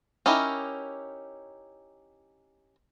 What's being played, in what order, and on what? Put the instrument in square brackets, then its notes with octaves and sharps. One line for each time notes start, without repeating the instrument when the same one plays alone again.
[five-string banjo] C#4 D#4 E4 G4 A#4